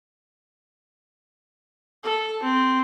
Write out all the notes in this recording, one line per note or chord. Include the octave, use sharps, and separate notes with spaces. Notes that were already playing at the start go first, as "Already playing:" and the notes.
A4
C4